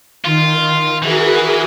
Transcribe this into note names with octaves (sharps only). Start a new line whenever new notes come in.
D#3 F4
E3 F#4 G#4 A#4